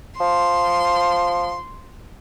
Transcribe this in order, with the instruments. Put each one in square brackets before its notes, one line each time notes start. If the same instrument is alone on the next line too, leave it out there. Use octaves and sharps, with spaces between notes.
[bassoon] F3 [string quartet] C6